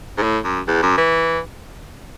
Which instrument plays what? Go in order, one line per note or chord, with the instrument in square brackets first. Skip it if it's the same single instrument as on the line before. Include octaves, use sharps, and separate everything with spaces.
[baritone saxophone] G#2
A2
F#2
E2
F#2
E3